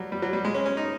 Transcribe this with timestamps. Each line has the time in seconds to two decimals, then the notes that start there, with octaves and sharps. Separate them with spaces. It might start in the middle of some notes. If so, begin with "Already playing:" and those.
Already playing: F#3 G3
0.12 G3
0.22 F#3
0.33 G3
0.45 G#3
0.54 C#4
0.66 C#4
0.77 D#4